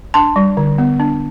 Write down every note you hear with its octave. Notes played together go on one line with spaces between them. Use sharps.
D4 A5 C6
G3
D3
B3
D4